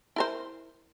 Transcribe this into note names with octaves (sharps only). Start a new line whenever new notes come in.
E4 A#4 C5